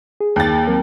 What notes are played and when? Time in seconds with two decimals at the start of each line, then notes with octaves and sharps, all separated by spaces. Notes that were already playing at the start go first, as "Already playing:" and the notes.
0.21 G#4
0.36 D#2 A6
0.67 F#3 C4 A#4